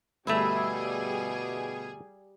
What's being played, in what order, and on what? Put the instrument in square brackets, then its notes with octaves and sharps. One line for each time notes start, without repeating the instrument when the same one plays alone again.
[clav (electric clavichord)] G1 A3 [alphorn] B2 [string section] G3 G#4 [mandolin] E4 E5 E6